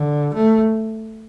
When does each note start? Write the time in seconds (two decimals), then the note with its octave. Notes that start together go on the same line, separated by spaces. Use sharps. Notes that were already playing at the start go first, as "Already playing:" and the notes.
Already playing: D3
0.34 A3